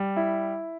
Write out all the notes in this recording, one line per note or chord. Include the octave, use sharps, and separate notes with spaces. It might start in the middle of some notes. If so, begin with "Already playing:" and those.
Already playing: G3
E4